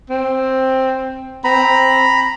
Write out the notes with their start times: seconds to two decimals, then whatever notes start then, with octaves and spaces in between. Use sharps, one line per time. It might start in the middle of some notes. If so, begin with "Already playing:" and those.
0.10 C4
1.44 C4 A#5 B5